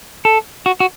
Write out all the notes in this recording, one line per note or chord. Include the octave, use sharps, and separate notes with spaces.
A4
F#4
F#4